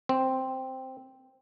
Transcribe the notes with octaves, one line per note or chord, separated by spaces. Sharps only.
C4